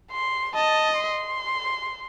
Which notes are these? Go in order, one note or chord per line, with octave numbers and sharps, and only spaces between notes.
C6
D#5 A5
C6